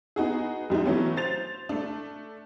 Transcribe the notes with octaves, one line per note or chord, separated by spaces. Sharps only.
B3 D#4 F#4 G#4
F2 G3 G#3 D#4
E3 F#3 A3 B3 C#4
C5 A6 F7
A3 D4